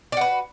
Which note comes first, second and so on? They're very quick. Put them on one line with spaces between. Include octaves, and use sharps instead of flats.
D5 F#4 B4